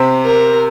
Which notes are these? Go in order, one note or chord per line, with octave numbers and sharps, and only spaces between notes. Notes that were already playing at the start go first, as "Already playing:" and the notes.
Already playing: C3 C4
A#4